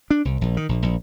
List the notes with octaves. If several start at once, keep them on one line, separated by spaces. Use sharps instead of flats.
D4
C2
A#1
D#3
A#1
A#1